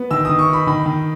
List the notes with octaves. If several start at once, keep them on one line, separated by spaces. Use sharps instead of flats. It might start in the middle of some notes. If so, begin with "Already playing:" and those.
Already playing: B3
D#3 E6
D#3 D#6
C#6
D#4 B5
D#3 B5
D#3